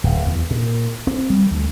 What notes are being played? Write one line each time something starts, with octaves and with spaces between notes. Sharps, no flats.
D1
E2
A#2
C4
G3
D2